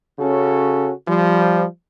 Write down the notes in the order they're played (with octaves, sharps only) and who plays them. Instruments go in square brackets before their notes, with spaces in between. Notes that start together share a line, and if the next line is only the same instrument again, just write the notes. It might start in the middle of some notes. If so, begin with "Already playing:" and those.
[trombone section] C#3 C#4 F#4 A4
F3 G3